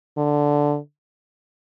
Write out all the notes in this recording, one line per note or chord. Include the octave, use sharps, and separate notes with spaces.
D3